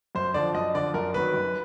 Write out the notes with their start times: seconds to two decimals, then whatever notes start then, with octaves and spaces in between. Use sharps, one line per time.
0.15 F#2 C5
0.34 D3 F3 D5
0.55 F#2 D#5
0.74 D3 F3 D5
0.94 F#2 A#4
1.14 D#3 F#3 B4
1.34 F#2